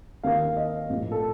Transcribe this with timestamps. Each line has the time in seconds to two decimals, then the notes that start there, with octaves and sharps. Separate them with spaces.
0.23 D#2 D#3 A#3 F5
0.57 D#5
0.90 A#1 A2 F3
1.12 A4